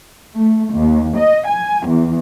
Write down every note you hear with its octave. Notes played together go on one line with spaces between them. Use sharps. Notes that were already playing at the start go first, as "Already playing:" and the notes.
A3
D#2
D#5
G#5
E2